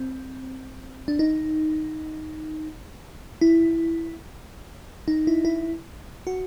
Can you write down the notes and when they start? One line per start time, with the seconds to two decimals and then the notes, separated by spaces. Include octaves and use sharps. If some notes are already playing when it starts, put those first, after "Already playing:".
Already playing: C4
1.08 D4
1.19 D#4
3.41 E4
5.08 D#4
5.27 E4
5.45 E4
6.27 F#4